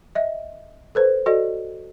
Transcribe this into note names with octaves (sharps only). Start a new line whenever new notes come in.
D#5 E5
A4 B4 C5
F#4 A4 D5 D#5